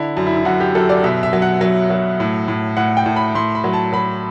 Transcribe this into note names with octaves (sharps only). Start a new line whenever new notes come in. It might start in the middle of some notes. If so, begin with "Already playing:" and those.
Already playing: D3 E4
F#2
E4
E4
F#2 F#4
G4
F#2 A4
D5
B2 E5
E5
F#3
F#5
F#3
F#3
A2
A2
A2 F#5
G5
A2
B5
A2 C6
B5
F#3
A5
F#3 B5